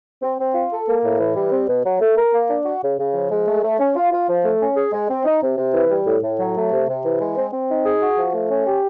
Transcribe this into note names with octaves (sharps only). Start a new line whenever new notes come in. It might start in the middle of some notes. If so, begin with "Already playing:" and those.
C4
C4
F4
A4
A#3
A2
E3
G3
C4
B2
F#3
A3
A#4
A#3
D4
F#4
C#3
C#3
F3
G#3
A3
A3
C#4
F4
F4
F3
A3
C#4
G#4
G#3
C4
D#4
C3
C3
E3
G3
A2
A2
F#3
A3
C3
C3
E3
G#3
C4
C4
D#4
G#4
F#4
F3
A3
C#4
G4